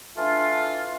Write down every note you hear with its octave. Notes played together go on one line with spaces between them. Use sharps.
E3 A3 D4 F4